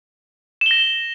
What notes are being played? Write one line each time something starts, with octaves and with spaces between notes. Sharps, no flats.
A#6 E7 G7